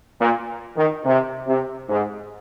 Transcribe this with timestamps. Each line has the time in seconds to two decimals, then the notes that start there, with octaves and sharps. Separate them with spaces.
0.21 A#2
0.77 D#3
1.05 C3
1.47 C3
1.89 G#2